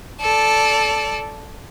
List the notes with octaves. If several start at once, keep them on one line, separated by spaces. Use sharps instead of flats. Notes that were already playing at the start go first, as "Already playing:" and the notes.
A4 D5